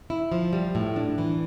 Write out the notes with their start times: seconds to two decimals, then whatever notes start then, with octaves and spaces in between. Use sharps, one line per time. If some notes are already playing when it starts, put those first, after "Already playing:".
0.10 E4
0.32 F3
0.53 G3
0.75 A2
0.96 D4
1.18 E3